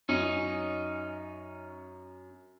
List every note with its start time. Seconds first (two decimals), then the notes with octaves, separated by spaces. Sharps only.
0.09 F#2 C#4 D#4